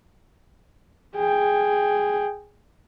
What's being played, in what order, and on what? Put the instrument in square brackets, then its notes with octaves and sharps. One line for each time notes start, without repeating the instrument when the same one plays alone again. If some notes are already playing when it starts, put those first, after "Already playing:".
[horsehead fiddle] G#4 G5